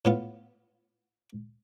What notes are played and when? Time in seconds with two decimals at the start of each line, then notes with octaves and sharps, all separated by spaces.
0.05 A2 B3 F4